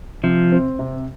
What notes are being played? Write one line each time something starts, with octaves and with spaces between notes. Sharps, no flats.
C3 F3
C4
C3